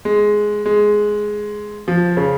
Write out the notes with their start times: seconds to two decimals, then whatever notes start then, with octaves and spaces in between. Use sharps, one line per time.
0.05 G#3
0.66 G#3
1.88 F3
2.17 C#3